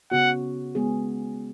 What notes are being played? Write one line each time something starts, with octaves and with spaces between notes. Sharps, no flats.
C#3 B3 F#4 F#5
G#3 B3 G#4